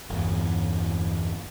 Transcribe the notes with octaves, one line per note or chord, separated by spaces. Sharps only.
G1 E2